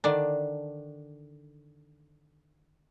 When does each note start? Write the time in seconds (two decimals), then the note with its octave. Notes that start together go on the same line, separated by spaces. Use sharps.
0.04 D3 D#3 D4